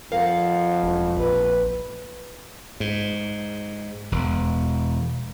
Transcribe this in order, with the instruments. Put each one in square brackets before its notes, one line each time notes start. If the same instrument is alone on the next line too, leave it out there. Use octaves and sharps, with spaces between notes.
[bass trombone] F2 [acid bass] A#4 [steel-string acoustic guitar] F5 F#5
[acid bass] E1
[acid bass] A#1 [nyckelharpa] B4
[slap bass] G#2
E1